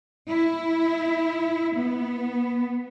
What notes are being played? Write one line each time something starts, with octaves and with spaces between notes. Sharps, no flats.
E4
B3